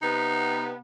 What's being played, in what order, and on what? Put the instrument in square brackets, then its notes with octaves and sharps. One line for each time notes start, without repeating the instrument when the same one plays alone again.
[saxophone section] C3 B3 [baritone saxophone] D#4